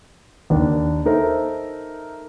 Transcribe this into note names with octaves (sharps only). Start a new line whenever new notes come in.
D#2 D#3 A#3 D4
D#4 A4 A#4 C5 E5